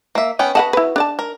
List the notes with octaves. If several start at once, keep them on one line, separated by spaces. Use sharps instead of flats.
A#3 E5
B3 C#4 G5
F#4 B4 D#5 F#5 A5
E4 B4
D4 D5 A5
A#4